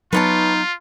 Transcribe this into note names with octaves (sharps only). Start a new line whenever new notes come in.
F#3 B3 D#4 F4 B4 C#5 A5